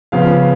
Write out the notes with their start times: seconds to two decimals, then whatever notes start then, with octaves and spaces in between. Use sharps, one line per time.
0.12 C#3 F3 B3 F5